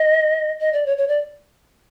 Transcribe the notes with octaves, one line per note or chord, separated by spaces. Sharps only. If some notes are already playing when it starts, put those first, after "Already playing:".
Already playing: D#5
D#5
D5
C#5
C#5
D5